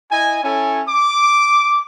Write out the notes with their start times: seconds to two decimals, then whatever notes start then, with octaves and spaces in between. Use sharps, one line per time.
0.12 E4 D#5 G#5
0.44 C#4 E4 A4 C#5 G#5
0.88 D6